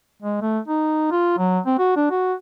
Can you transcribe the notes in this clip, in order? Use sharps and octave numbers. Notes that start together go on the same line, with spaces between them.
G#3
A3
D#4
F4
F#3
C4
F#4
D4
F#4